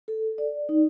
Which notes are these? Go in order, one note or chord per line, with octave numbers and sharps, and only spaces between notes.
A4
D5
D#4